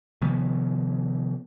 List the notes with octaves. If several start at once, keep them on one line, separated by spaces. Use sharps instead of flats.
C3 D#3 F3 B3